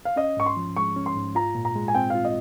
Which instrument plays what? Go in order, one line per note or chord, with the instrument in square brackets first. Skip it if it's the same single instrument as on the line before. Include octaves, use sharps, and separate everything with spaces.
[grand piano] F5
[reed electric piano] C#4 [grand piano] D#5
[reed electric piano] G#2 [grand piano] C#6
[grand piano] C6
[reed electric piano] F3
[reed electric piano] G#3 [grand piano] C#6
[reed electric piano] C#4
[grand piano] C6
[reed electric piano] G#2
[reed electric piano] F4 [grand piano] A#5
[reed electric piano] A#2
[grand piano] A#5
[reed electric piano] G#3
[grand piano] G#5
[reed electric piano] C4 [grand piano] G5
[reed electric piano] F4 [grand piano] F5
[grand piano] D#5